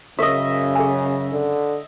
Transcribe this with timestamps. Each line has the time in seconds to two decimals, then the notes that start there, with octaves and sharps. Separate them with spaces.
0.19 F#2 C#3 A#4 D#5 E5 C#6
0.75 G#4 G#5
1.33 D3